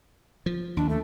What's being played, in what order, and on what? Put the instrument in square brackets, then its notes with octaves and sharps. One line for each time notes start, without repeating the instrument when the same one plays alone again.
[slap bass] F3
[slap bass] D#2 [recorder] D4
[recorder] A3